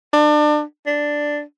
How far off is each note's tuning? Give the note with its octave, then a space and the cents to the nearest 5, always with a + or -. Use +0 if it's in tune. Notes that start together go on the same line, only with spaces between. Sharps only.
D4 +30
D4 +0